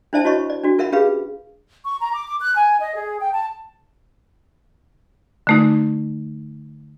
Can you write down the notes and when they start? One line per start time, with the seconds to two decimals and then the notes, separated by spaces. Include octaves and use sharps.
0.13 D4 E4 C5 D5 E5 A5
0.24 E4 F#4 C#5 D#5 B5 C#6
0.50 D5
0.64 D4 F#4
0.78 F4 A#4 E5 F#5 B5
0.92 C#4 G4 G#4 B4 F5 B5
1.85 C#6
2.01 A#5
2.13 D6
2.27 D6
2.41 F#6
2.55 G#5
2.80 D#5
2.95 G#4
3.20 G5
3.33 A5
5.47 D3 A3 D#4